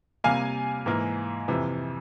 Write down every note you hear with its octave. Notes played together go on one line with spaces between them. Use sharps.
C3 G3 A#3 F5 G#5
G#2 E3 A#3
F2 C3 E3